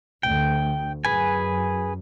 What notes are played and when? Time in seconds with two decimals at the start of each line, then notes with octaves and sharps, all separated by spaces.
0.23 D2 G5
1.05 F#2 G#4 B4 G#5